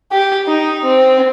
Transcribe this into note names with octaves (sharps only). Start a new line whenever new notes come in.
G4
D#4
C4